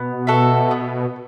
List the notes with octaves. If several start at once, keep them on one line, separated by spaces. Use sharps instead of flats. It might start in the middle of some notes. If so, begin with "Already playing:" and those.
Already playing: B2 B3
F#4 A4 E5
B3